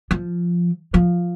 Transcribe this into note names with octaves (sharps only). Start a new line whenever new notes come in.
F3
F3